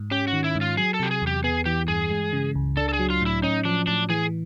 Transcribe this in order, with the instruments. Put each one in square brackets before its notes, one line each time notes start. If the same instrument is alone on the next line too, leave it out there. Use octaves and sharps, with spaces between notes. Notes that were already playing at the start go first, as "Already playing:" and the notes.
Already playing: [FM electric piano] G#2
[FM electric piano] C#4 [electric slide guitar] G4
[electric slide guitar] F#4
[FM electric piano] D#3
[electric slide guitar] E4
[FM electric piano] G#2
[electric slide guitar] F4
[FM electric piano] F#3 [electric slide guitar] G#4
[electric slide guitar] A4
[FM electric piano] C3 [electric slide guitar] G4
[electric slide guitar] G#4
[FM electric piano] E2 [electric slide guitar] G4
[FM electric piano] B3 [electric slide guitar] G#4
[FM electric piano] E3 [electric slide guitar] G4
[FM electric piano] G2 [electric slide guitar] G#4
[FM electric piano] G#3
C#3
C#2
[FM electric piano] D4 [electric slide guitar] A4
[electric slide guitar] A4
G#4
[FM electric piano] F#3
[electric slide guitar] F4
[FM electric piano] A2 [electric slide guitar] E4
[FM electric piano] C#4 [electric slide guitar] D#4
[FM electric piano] F3 [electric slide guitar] D4
[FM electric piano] A2 [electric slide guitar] D4
[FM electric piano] E3 [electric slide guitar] G#4